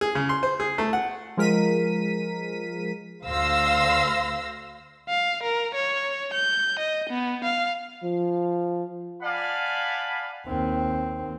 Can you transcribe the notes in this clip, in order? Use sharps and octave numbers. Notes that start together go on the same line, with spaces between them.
G#4
C#3
C6
C5
G#4
A3
F#5
F3 G#3 A#4 B6 D#7
D2 C5 F5 C6 E6 A#6
F5
A#4
C#5
G6
D#5
B3
F5
F3
D5 F5 F#5 G#5 A5 B5
D#2 C4